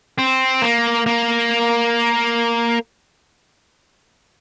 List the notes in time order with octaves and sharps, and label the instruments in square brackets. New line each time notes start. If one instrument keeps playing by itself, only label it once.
[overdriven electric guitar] C4
A#3
A#3